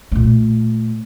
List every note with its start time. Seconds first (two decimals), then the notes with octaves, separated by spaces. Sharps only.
0.12 A#2 A3